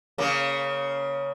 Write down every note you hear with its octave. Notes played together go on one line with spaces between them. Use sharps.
C#3 A#3